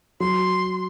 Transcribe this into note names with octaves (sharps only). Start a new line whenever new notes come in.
F#3 C6